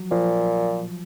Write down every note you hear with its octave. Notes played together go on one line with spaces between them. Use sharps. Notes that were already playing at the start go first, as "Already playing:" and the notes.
Already playing: F3 F#3
A#2 F3